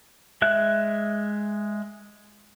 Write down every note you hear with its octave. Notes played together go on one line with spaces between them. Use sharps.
G#3 E5 F#6